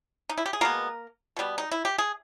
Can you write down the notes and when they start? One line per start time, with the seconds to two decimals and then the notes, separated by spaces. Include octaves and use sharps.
0.29 D#4
0.38 E4
0.46 G4
0.53 G#4
0.61 B2 G#3 A#3 B3 A#4
1.37 B2 G3 B3
1.58 D#4
1.71 E4
1.85 G4
1.98 G#4